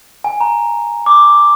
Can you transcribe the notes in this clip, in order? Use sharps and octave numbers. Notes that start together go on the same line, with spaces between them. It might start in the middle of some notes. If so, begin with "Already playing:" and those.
G#5
A#5
D6